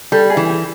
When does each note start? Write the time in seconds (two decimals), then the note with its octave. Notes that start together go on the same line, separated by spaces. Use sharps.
0.12 G3 A4
0.30 G#4
0.37 E3
0.49 G4